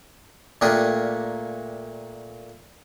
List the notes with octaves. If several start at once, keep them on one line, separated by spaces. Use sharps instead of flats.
A#2 A3 A#3 D4 G4 G#4